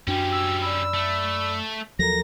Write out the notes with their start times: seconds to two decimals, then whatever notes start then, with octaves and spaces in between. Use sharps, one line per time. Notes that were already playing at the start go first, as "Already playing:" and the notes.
0.07 F#2 G3 C#4 D4 F#4 G5
0.32 E6
0.62 D5 B5 E6
0.94 A3
1.99 D#2 F3 F#3 A4 A#4 A#5 A#6